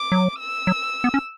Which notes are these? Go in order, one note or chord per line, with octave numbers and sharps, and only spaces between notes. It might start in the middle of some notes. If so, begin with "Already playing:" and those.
Already playing: D6
F#3
E6
F#3
B3
C#4